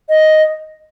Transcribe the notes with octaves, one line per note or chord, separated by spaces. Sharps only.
D#5